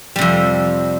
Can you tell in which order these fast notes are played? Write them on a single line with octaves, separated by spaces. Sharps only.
G3 C3 F2